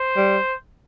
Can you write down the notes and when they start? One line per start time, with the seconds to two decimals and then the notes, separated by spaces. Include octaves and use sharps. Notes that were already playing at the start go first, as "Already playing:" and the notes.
Already playing: C5
0.17 G3